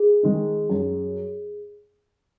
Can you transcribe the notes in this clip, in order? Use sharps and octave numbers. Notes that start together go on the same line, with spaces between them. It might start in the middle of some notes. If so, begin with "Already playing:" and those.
Already playing: G#4
D#3 G#3 D#4
F#2